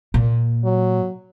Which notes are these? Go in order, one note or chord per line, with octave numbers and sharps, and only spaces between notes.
A#2
F#3